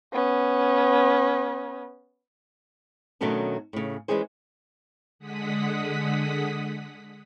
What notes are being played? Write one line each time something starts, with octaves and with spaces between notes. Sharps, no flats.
B3 C#4
B2 D#3 F#3 A3 C#4 D4
A2 C#3
E3 F#3 G#3 C#4 G#4 C5
D3 G#3 F#5 D#6 B6